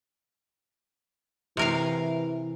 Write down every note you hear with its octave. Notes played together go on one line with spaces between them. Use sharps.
C3 E3 A#4 F5